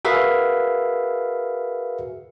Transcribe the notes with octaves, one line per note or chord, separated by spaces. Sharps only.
F#4 G#4 A#4 B4 E5 F5